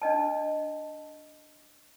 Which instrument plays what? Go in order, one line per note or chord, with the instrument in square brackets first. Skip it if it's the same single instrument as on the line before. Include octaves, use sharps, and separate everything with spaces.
[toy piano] D4 D#5 A5